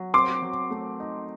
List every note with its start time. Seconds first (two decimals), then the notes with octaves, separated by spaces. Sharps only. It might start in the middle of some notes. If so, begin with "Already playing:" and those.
Already playing: F#3
0.14 C4 C6 D6
0.42 F#3
0.71 A3
1.00 D#4